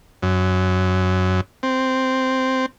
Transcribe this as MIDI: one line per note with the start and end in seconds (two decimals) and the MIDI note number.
0.22 1.41 42
1.63 2.66 60